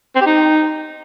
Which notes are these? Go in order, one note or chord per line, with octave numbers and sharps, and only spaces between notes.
C4
G4
D#4